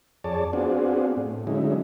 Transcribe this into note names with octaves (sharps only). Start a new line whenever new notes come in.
F2 G#4 C#5 D5 A5
B3 C4 D4 F4 F#4 G#4
A2
D3 F#3 G#3 C#4 D#4 E4